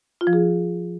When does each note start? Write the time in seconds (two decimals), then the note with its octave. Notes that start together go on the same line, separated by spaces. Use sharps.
0.21 F4
0.27 F3
0.33 G#4